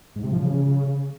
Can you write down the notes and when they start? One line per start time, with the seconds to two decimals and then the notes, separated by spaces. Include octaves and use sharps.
0.16 G#2
0.24 C3
0.31 F3
0.39 C#3